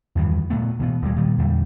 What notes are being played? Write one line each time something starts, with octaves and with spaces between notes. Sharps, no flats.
E2 G2 D#3 E3
A#2 A3 B3
B2 E3 B3
D#1 D#2 G3 G#3
A#2 D#3 G3
E2 A#2 D3 G3